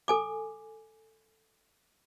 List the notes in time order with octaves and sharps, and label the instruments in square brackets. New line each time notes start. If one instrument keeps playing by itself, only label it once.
[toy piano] A4 G#5 D6